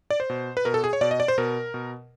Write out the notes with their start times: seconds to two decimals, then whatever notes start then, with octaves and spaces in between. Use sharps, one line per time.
0.10 D5
0.20 C5
0.30 B2
0.57 B4
0.65 B2 A#4
0.74 A4
0.84 G#4
0.93 C#5
1.01 B2 D5
1.11 D#5
1.20 D5
1.28 C5
1.38 B2 A#4
1.74 B2